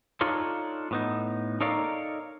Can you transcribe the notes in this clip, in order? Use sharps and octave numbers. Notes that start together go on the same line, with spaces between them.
D4 D#4 F4 A4 C#5
A2 B3 D#4
D#4 A4 A#4 C#5 D5 F5